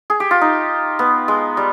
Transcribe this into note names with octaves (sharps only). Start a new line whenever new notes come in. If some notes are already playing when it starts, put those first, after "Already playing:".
G#4
G4
F4
D#4
B3
G#3
G3